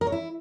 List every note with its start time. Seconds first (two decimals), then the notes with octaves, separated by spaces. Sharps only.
0.01 A#4
0.07 C#5
0.12 E4